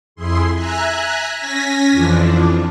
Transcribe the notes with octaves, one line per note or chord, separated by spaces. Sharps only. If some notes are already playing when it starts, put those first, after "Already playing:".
F2 E4 G#4 C6
E5 G#5 A#5 F#6
C#4 G#5 A#6 B6
F2 E3 F3 D4